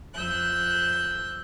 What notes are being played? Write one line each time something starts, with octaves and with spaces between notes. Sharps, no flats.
F2 E6 F#6 G6